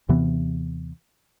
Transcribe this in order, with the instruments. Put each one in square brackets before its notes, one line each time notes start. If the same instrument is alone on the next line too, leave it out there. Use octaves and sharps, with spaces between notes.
[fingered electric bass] D#2 C3 E3 B3